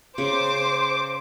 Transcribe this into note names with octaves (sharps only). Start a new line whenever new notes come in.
C#3 C5 D6